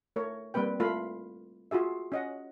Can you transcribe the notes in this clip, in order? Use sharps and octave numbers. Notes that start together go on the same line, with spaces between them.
A3 A#4 C#5
G3 A#3 C4 B4 G5
A3 F4 A#4 F5 B5
F4 F#4 G#4 E5
C#4 D#5 F#5